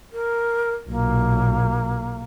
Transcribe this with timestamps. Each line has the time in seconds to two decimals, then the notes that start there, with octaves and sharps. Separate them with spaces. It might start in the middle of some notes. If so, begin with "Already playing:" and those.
0.12 A#4
0.89 B1 A#2 A#3